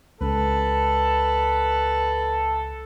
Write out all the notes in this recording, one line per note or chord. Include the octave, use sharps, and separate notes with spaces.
C#2 A4 B4